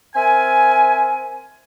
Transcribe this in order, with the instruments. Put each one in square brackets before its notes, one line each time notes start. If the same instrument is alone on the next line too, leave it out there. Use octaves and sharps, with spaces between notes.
[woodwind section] C4 A#4 E5 G#5